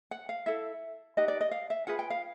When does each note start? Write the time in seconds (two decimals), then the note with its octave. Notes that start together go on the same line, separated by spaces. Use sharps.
0.11 F#5
0.29 F5
0.46 E4 A4 E5
1.17 D#4 G4 B4 D#5
1.28 D5
1.41 D#5
1.51 F5
1.70 E5
1.87 F4 G#4 B4 F#5
1.99 G5
2.10 F5